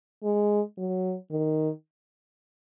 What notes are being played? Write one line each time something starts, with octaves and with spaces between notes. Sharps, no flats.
G#3
F#3
D#3